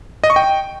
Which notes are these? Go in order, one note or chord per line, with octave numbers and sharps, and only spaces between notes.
D#5
C#6
G5